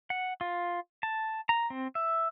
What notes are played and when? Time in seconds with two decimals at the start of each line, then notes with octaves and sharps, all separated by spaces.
0.10 F#5
0.41 F4
1.03 A5
1.49 A#5
1.70 C4
1.95 E5